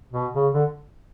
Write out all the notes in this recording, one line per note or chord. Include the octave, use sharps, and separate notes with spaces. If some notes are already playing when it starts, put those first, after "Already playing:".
B2
C#3
D3